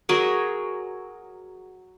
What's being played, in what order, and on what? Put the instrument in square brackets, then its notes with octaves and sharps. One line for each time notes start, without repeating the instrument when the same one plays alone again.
[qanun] F#3 G#4 A#4